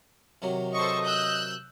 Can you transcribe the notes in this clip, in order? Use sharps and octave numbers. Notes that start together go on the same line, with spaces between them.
C3 D#3 F#3
A4 C5 D#5 C#6
E6 F#6 G6